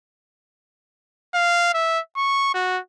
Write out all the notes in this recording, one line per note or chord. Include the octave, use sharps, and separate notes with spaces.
F5
E5
C#6
F#4